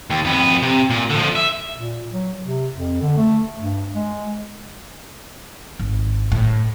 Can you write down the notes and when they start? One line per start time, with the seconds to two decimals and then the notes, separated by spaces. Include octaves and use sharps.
0.10 D#2
0.25 F2 B3
0.62 C3
0.90 A#2
1.10 D3 F3
1.36 E5
1.76 A#2
2.11 F#3
2.42 C3
2.73 F2
3.01 D3
3.17 A3
3.57 G2
3.94 G#3
5.80 G#1
6.32 A2